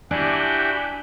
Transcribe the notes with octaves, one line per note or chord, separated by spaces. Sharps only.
D4 E4 F#4 G4 G#5 D6 F#6 G6